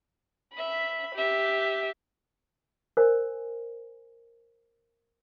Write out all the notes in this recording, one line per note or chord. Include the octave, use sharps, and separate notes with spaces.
E5 B5
G4 E5
A#4 C5 D#5 G#5